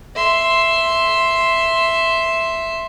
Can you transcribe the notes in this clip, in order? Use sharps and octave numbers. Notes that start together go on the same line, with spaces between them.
E5 C6